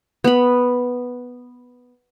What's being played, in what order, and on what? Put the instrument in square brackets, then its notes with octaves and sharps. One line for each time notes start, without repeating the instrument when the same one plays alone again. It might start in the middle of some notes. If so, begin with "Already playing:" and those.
[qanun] B3 B5